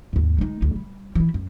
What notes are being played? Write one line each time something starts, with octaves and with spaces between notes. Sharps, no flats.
D#2 G#2
G#3 D#4
D2
G3
E3 E4
F#2